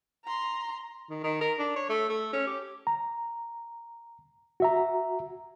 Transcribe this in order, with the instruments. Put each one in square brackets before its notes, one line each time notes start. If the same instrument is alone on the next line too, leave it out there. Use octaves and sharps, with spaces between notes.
[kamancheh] A#5 C6
[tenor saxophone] D#3
D#3
A#4
D4
C#5
A3
A3
C#4
G4
[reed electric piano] A#5
F#4 E5 A#5